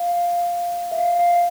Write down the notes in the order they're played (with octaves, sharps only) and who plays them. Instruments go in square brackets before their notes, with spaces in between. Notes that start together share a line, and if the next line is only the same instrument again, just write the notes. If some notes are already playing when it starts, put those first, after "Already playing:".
Already playing: [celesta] F5
E5
F5
F5